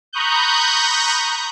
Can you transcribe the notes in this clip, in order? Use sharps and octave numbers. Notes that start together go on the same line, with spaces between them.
A#5 B5 C#6 D#6 F#6 G6